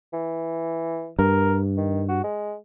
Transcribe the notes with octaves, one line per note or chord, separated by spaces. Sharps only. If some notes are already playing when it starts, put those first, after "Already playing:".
E3
G2 A#4
D#3
F#4
G#3